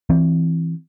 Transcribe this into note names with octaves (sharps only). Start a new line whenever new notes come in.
E3 C4